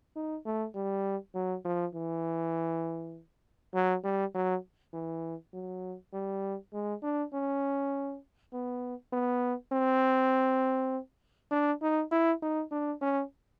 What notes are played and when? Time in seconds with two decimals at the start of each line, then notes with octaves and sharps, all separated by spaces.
0.16 D#4
0.45 A3
0.75 G3
1.35 F#3
1.65 F3
1.95 E3
3.74 F#3
4.04 G3
4.34 F#3
4.93 E3
5.54 F#3
6.13 G3
6.73 G#3
7.03 D4
7.33 C#4
8.53 B3
9.12 B3
9.72 C4
11.51 D4
11.82 D#4
12.11 E4
12.42 D#4
12.71 D4
13.01 C#4